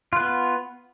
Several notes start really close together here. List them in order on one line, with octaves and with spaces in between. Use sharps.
F4 B4 B3